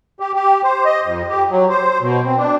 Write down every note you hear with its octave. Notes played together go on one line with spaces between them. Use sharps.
G4
G4
C5
D#5
F2
G4
F#3
C5
B2
C4
D4